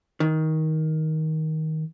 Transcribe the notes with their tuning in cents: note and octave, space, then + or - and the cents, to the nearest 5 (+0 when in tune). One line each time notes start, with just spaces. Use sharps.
D#3 +15